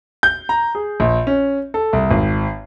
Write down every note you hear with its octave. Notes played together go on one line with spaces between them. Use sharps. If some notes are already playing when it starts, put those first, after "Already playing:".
G6
A#5
G#4
A#1
C#4
A4
C2
G#1